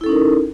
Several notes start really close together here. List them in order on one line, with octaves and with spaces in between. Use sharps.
E4 A4 C#4 D#4 A#4